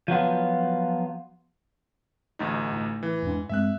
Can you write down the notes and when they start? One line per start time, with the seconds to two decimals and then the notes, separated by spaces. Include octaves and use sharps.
0.08 F3 F#3 B3 F4
2.39 A1 D2 D#4
2.72 A2
3.03 E3
3.22 E2 G#2 D4
3.49 G2 G#3 C4 E5 F#6